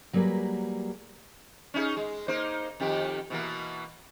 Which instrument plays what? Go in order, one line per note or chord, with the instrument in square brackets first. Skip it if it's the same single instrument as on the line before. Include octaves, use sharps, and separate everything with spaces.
[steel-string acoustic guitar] F#3 G3 A#3 E4 G#4 B4
[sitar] C#4 D#4 G#4
G#3
A#3 D#4 C5
F2 D#3 G4
B2 E3 A#3